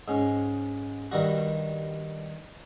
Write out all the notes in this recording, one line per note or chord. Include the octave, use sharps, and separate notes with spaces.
G#2 C#4
G2 D#3 G3 F#4